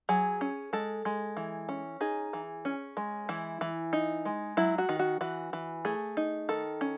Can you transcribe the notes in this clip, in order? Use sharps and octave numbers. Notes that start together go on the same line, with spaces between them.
F#3 G#4
C#4
G#3 A4
G#3
E3
C#4
D#4 G#4
E3
C#4
G#3
E3 E4
E3
D#4
G#3
F#3 E4
F#4
D#3
F#4
E3 F#4
E3
A3 G#4
D#4
D#3 A4
C#4